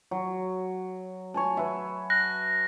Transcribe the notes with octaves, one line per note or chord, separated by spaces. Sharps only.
F#3
C#5 G#5 A5
B4 E5
F#6 A#6